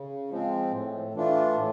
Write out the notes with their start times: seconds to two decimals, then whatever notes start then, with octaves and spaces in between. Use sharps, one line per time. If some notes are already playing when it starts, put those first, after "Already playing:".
Already playing: C#3
0.30 F3 G#3 C4
0.71 A2
1.14 E3 A3 D4 F4
1.56 A2